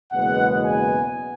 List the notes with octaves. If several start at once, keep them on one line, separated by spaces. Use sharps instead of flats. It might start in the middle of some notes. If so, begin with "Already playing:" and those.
F#1 E2 B2 G#3 B3 F#5
G#5